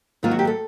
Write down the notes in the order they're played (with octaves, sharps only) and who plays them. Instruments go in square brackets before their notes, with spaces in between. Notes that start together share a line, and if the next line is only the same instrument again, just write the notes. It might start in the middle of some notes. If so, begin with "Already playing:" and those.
[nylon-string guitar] G#2 D#3 F#3 A#3 F4
F#4
G4
A4